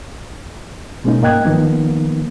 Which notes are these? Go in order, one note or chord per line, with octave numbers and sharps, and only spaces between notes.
B2 G#3 A#3 C#4 D#4
G#2 A#3 D#5 G5 F#6 G#6
D#3 F3 A#3 B3 D#4